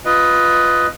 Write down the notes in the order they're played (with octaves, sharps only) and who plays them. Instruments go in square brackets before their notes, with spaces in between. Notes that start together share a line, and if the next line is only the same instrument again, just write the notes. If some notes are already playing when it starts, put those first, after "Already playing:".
[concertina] F4 B4 D#5